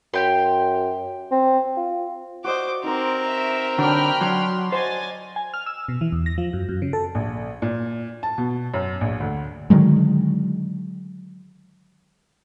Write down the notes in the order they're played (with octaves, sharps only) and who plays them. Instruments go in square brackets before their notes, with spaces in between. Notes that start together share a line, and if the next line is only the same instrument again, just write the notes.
[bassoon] F#2 [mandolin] G4 G5 C6
[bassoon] C4
F4
[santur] F#4 D5 D#5 [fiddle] C5 D6
[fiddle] C4 A#4 [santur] D#4 C5
[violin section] E5
[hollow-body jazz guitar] D3 [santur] F#3 D4 [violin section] G5 B5 F6
[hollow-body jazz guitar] F#3 [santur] D4 [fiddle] C6
[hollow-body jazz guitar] C5 [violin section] D#5 G#5 A6 [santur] F#5
[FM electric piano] G#5
F6
E6
B2
E3
E2
A#6
F3
F#2
F#2
C#3
A4
[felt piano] A#1
A#2
A5
B2
F#2
A#1
D2
[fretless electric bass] D3 D#3 F#3 G#3